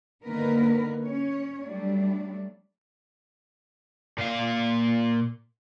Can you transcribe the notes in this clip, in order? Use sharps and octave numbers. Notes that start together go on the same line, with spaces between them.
D3 D#3 A#3 B3 A#4 B4
C#4 C#5
F#3 G3 A3 D4
A#2 F5